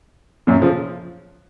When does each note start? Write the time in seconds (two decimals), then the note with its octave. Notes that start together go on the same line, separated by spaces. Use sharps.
0.47 F#2 A#2
0.62 C#3 F3